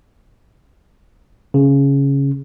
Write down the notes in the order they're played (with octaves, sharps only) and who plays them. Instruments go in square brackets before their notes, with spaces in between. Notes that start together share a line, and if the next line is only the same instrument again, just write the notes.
[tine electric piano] C#3